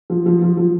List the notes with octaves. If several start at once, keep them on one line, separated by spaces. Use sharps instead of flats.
F3
F3
F3
F3